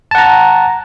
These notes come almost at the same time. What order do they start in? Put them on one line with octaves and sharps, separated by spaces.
A5 F#5 A#5